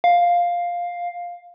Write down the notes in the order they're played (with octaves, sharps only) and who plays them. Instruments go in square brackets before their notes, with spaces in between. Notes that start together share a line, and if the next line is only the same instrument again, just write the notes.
[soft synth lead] F5